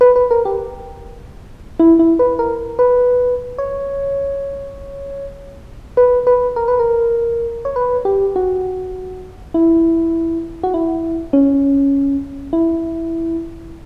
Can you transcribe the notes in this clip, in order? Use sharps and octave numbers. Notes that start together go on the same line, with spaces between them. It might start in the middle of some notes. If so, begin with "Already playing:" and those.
B4
B4
A#4
G4
E4
E4
B4
A#4
B4
C#5
B4
B4
A#4
B4
A#4
C#5
B4
G4
F#4
E4
F#4
E4
C#4
E4